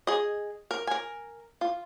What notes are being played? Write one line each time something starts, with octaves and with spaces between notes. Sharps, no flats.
G#4 D#5
A#4
A#4 G#5
F4